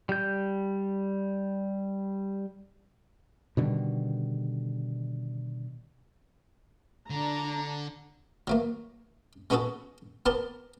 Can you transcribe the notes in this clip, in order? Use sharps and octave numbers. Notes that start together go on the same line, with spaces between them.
G3 G6
B2 D3 D#3 G3
D3 D4 A#5
F#3 A3 A#3
G#3 B3 C#4 F#4 G#4 A4
B3 G4 A#4 C5 A5